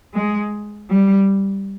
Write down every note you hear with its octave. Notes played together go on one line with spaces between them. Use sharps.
G#3
G3